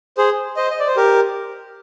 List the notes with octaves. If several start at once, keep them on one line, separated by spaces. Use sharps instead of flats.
G#4 C5
C5 D#5
D#5
D5
C5
G4 A#4